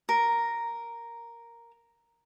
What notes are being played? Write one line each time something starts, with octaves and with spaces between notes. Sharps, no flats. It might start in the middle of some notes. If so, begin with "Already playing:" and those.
A#4